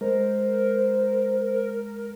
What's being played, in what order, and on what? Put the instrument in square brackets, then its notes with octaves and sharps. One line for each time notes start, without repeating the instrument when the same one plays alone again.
[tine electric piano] G#3 [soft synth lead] A#4 [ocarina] C5